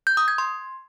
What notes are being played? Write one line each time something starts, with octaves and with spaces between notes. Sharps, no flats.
G6
D#6
G#6
C6